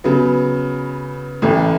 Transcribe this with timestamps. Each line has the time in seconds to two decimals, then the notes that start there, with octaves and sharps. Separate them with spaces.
0.04 C#3 F#3 B3
1.42 A1 A2 E3